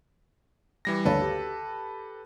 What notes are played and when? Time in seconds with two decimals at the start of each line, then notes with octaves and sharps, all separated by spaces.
0.85 E3 G3 A#6
1.05 D2 A4 B4 C#5 F5
1.22 G4